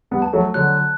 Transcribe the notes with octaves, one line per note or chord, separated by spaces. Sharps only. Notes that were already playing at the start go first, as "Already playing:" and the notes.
G3 B3
A5
F#3 A3
D3 F#3 F#6